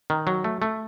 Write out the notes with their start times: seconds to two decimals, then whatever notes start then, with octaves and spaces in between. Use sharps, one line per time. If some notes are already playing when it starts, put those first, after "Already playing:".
0.10 D#3
0.27 F#3
0.44 A3
0.62 A3